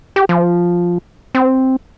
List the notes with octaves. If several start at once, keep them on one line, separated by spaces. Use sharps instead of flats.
G4
F3
C4